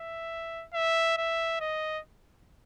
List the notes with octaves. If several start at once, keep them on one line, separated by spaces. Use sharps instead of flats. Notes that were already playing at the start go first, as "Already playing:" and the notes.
Already playing: E5
E5
E5
D#5